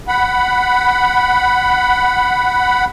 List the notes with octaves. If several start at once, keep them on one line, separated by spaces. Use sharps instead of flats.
F#5 B5